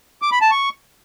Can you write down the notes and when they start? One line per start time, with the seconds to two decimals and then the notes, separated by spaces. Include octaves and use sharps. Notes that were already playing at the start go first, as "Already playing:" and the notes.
0.22 D6
0.32 B5
0.41 A5
0.51 C#6